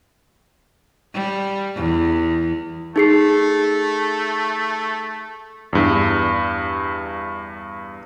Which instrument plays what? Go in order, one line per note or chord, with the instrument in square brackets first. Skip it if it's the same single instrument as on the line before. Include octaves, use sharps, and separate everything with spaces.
[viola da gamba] G3
E2
[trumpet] A3 [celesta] D#4 G#4 C7
[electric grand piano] E2 G2